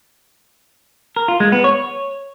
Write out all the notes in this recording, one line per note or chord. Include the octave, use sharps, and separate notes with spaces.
A#4
F4
G#3
B3
C#5